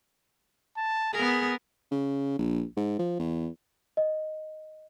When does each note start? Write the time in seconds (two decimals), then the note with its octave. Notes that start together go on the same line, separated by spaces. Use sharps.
0.77 A5
1.13 B3 G#4 A#4
1.91 C#3
2.39 A#1
2.77 G#2
2.99 F3
3.19 E2
3.97 D#5